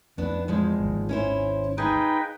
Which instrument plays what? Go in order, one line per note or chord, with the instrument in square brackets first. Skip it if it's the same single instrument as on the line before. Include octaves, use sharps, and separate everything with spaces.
[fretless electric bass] F2 [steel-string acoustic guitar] B3 D4 E4
[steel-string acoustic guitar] E2 F3 G#3
[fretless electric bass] G#1 D#2
[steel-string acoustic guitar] C#4 E4 C5
[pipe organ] D#4 B4 G5 [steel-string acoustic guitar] G#4 F5